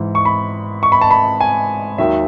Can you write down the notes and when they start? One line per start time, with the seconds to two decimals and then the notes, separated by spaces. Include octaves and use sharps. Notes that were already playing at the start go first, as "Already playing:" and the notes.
Already playing: G#2 E3
0.15 C#6
0.25 B5
0.83 C#6
0.92 B5
1.01 A5
1.11 B5
1.41 G#5
1.98 D#2 D#3 F#3 E5